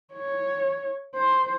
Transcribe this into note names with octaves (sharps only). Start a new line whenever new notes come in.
C#5
C5